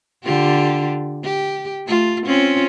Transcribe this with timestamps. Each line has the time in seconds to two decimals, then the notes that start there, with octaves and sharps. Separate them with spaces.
0.24 D3 F4 G4
1.24 G4
1.87 A3 F4
2.26 C4 C#4 F4